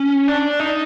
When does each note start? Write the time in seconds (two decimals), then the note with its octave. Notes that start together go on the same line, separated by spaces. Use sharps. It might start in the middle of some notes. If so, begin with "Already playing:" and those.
Already playing: C#4
0.28 D4
0.60 D#4